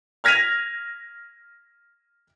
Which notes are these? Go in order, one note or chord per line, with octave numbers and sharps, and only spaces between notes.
F6 G#6 A#6 B6 D#7 F7